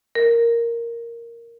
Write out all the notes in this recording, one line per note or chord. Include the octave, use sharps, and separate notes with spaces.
A#4